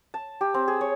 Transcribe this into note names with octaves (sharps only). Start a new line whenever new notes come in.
A5
G4
C4
G#4
C#5